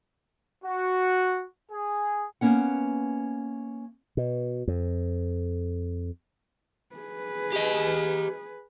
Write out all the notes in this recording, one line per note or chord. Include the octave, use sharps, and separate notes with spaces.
F#4
G#4
A#3 B3 C#4 F#5
B2
F2
G#4 B4
G4 D#5